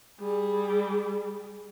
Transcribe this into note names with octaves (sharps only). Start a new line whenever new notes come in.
G3 G#4